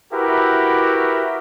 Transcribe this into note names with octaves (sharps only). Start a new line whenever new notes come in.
E4 F#4 G4 A#4 B4 E5